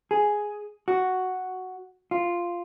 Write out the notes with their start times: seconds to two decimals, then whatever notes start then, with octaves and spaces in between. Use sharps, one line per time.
0.11 G#4
0.88 F#4
2.11 F4